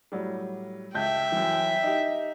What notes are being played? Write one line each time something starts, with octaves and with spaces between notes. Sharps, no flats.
A2 F#3 G3
C#2 E5 G5 A5 G6
F#2 E3
D#4 G4